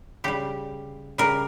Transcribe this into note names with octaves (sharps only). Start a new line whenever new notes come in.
C#3 G3 G4
C#3 G3 A#4